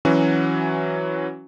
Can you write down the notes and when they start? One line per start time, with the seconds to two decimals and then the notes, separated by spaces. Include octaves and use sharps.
0.05 E3 F#3 C#4 F#4